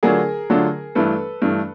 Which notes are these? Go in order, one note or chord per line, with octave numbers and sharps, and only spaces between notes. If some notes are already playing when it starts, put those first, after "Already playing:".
D3 F#3 A3 D4 F4 G#4 A#4
D3 F#3 A3 D4 F4
G2 E3 A3 A4 B4
G2 E3 A3